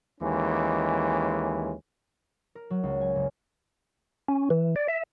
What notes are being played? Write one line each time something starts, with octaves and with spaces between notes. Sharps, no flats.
D#2 E3 G#3 C#4
A#4
F#3
C#2
G#5
F#1
C#4
E3
D5
E5